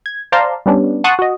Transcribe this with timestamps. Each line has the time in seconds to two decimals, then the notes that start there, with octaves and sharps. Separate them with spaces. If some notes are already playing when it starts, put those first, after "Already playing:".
0.06 G#6
0.32 C5 D5 F5 A5 A#5 C6
0.66 G3 B3 C#4 D4
1.04 F#5 A5 C6 C#6 D#6 F#6
1.19 F#4 D#5